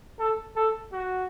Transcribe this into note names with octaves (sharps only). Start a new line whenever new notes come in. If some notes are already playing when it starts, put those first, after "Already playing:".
A4
A4
F#4